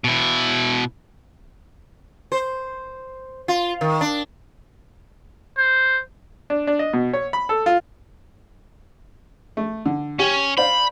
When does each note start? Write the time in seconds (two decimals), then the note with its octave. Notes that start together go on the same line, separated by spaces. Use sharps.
0.04 B2 E4
2.32 C5
3.48 F4
3.81 D#3
4.01 D4
5.58 C5
6.50 D4
6.67 D4
6.79 D#5
6.93 B2
7.13 C#5
7.33 B5
7.49 A4
7.66 F4
9.57 A3
9.86 D3
10.19 C#4 G4
10.58 C5 D5 F5 B5